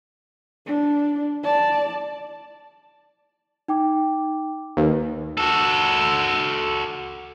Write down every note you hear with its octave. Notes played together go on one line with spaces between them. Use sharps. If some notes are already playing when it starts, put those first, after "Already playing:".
D4
D5 A5
D#4 G5 D6
D#2 B4
F#4 A4